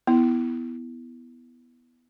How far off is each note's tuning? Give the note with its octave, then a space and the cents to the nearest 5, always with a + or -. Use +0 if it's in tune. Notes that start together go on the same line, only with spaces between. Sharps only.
B3 +0 E4 +0